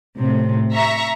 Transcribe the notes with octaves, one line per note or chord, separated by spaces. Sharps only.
A2 C3
E5 A#5 C#6